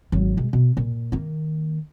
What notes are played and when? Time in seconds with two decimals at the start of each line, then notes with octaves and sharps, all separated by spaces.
0.12 G#1 F#3
0.37 B2 G#3
0.53 B2
0.77 A#2
1.12 D#3 A#3